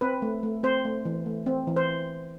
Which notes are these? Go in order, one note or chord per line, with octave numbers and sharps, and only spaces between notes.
C4 B4
A3
A3
C4 C5
A3
E3
A3
C4
E3
C5